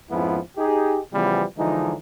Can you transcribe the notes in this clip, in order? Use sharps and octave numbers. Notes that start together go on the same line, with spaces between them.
F2 G#2 F3 B3 C#4 E4
D#4 G4 G#4
C#3 E3 F3 G3 B3
D3 E3 F3 G#3 D#4